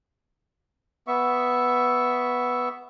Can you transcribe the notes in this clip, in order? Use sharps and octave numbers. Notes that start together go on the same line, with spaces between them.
B3 E5 C#6